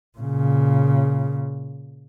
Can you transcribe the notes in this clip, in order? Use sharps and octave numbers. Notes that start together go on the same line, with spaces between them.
A#2 C#3